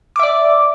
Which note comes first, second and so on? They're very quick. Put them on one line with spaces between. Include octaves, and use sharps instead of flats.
D6 E5 D5